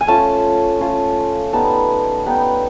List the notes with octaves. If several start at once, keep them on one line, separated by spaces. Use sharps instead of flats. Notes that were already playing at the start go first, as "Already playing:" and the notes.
G#5
A3 C#4 F4 A5
A3 C#4 F4
G3 B3 D#4 A5
G3 B3 D#4 G5